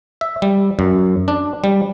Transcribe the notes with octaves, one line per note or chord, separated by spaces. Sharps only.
E5
G3
F#2
D4
G3